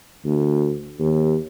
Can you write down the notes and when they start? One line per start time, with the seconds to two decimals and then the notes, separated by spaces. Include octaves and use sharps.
0.25 D2
0.99 D#2